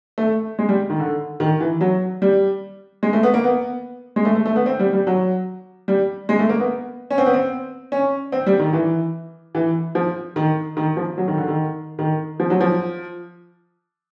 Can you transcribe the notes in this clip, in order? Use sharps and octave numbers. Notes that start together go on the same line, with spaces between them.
A3
G#3
G3
D#3
D3
D#3
E3
F#3
G3
G#3
A3
B3
A#3
B3
G#3
A3
A3
A3
B3
C4
G3
G3
F#3
G3
G#3
A3
A#3
B3
C#4
C4
B3
C4
C#4
C4
G3
D#3
E3
E3
F3
D#3
D#3
F3
F#3
D#3
D3
D#3
D#3
F3
F#3
F3